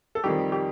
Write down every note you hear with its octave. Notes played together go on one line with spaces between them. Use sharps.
A4
F2 D#3 G3 G4
G4